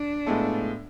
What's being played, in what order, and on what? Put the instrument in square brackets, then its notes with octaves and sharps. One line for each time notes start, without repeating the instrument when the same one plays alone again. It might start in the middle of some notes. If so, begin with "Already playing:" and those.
Already playing: [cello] D4
[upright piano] A2 G#3 B3 F4 A4